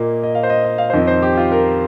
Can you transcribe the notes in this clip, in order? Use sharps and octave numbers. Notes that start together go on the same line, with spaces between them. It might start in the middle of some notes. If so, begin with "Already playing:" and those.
Already playing: A#2 A#3 D#5
D#5
F5
C5
D#5
D#5
F5
C5
F2 D#3 C4 D#5
C5
G4
F4
A#4